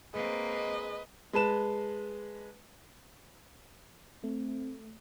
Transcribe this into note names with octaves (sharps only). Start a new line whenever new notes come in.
G#3 A#3 C4 B4 D#5
G#3 B4 A5 E7
A3 C4